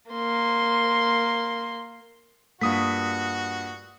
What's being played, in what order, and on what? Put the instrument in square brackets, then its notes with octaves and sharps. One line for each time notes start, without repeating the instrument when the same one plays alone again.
[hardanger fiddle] A#3 C6
[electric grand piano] G2 D#6 B6 [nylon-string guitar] A#3 F4 [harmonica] F#4